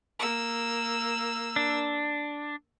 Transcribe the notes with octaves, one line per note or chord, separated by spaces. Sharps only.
A#3 E6
D4